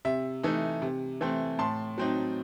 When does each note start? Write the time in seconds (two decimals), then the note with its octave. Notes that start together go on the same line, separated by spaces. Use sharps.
0.05 C3 E5
0.43 E3 A3 D#4
0.82 C3
1.21 E3 A3 C4
1.59 A2 A5 C6
1.98 F#3 C4 D#4